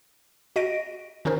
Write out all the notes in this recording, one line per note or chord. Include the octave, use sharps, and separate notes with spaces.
F#4 D#5 A#6 D7
D#3 C#4 D#4 A#4 C5